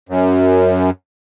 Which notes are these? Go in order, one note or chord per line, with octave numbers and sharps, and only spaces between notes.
F#2